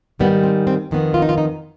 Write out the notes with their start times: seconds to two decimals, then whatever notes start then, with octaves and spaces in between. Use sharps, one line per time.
0.19 G#2 D#3 G3 B3
0.43 C4
0.67 C4
0.91 F2 D#3 B3
1.14 F4
1.22 D#4
1.29 F4
1.38 D#4